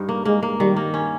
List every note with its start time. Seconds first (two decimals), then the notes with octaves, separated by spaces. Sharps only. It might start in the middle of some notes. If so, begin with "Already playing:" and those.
Already playing: G2 D#4
0.09 A#3
0.25 G#3 A#3
0.43 A#3
0.60 D#3 G3
0.76 A#3
0.94 C#4